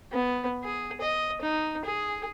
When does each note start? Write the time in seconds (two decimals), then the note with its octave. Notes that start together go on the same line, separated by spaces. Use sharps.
0.12 B3
0.64 G#4
1.01 D#5
1.41 D#4
1.85 G#4